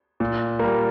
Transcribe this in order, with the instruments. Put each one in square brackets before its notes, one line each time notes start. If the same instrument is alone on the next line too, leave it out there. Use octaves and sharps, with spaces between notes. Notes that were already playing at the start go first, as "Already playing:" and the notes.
[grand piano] A#2
G3 A#3